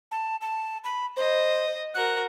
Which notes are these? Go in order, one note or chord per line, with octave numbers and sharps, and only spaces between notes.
A5
A5
B5
C5 D#5
F#4 A#4 F#6